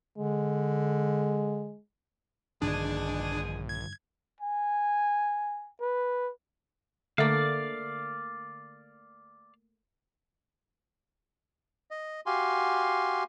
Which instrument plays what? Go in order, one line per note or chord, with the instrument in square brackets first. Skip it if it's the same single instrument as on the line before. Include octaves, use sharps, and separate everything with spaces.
[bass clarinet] D3 [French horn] G#3
[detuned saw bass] A#1 [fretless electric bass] G2 D3 D#3 [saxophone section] B2 G#3 G#4 [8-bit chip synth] D4
[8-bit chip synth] G#6
[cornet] G#5
B4
[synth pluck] D3 [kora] A3 A#3 [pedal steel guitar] D5 F5
[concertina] D#5
F#4 G4 F5 G#5 C6